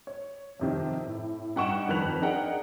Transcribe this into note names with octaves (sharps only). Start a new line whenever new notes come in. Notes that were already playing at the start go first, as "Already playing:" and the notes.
C#5
F2 C3 D#3
A2
G2 D#4 F#5 G5 C#6 E7
F2 D#3 A#4 B4 F#6 F7
D4 D#4 G#4 A#4 F#5 G5